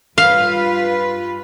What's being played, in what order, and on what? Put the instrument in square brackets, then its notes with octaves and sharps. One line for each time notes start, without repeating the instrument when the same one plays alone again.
[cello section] G2 F4 B4 [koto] F5